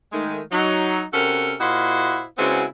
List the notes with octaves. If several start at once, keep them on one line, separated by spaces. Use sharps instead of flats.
D#3 G#3 A3
F#3 D#4
C3 C#4 F#4 A4 A#4
A#2 E4 F#4 C5 D#5 F5
C#3 G#3 B3 C4 E4 F#4